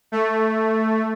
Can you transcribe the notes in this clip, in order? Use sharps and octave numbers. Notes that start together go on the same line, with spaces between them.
A3